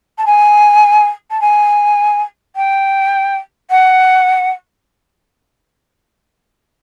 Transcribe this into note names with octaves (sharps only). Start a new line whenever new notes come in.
A5
G#5
A5
G#5
G5
F#5